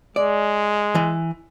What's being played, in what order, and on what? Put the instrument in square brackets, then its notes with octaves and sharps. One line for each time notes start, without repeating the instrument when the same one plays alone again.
[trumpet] G#3 [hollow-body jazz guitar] D5
[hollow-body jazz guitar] E3